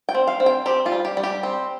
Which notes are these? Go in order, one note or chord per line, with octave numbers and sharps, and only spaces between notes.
G5
C4
F5
C4
G5
C4 G4
F4
G3
G4
G3
G4
C4